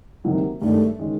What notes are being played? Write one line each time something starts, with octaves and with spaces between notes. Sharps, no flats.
C3 D#3 F#3 A#3
G2 D#3 G#3 A3 C#4
D#3 G#3 C#4